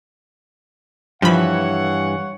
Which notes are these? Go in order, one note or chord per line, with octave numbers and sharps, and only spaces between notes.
G2 E3 F3 C#5 F5 F#5 B5